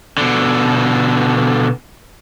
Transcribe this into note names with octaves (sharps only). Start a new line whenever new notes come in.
B2 D3